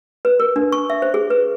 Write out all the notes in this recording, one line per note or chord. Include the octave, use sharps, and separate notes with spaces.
B4
A#4
D4
C#6
E5
C5
G#4
B4